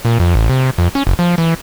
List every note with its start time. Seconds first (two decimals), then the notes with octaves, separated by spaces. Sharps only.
0.05 A#2
0.20 F2
0.35 A1
0.49 C3
0.78 F2
0.95 C#4
1.07 F#1
1.19 F3
1.38 E3